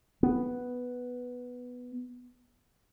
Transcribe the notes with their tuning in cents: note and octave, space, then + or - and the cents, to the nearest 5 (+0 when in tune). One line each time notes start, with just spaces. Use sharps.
B3 +0